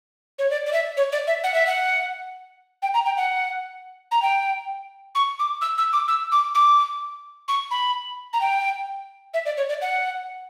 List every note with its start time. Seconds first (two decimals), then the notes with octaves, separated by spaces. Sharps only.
0.39 C#5
0.50 D5
0.66 D5
0.73 E5
0.97 C#5
1.12 D5
1.27 E5
1.44 F#5
1.54 E5
1.67 F#5
2.82 G5
2.94 A#5
3.05 G5
3.17 F#5
4.11 A#5
4.22 G5
5.15 C#6
5.39 D6
5.61 E6
5.78 E6
5.93 D6
6.08 E6
6.32 D6
6.55 D6
7.48 C#6
7.71 B5
8.33 A#5
8.41 G5
9.34 E5
9.45 D5
9.57 C#5
9.69 D5
9.81 F#5